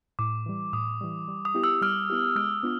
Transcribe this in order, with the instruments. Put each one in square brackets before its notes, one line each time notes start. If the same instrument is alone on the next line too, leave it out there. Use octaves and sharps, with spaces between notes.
[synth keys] A2 [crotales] D6
[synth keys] E3 G3
[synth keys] A2 [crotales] D#6
[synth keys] E3 G3
G3
[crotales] D#6
[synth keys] B3 E4 G4
[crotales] E6
[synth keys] G3 [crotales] F6
[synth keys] B3 E4 G4
[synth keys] G#3 [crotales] F6
[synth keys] B3 D4 F4